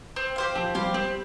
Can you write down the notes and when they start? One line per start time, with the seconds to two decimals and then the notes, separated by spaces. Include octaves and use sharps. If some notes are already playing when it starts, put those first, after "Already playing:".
0.16 C4
0.36 G4 C5 F5
0.55 F3 C4
0.75 G3 G4 C5 F5
0.94 G3 C4